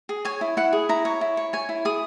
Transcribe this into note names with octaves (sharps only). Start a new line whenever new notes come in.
G#4
C#5 G#5
E4
E4 F#5
G#4
E4 A#5
C#5
E4
C#5
C#5 G#5
E4
G#4 D#6